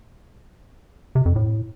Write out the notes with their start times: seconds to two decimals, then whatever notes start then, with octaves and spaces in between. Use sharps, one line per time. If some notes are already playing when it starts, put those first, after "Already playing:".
1.15 C3
1.26 F2
1.36 A2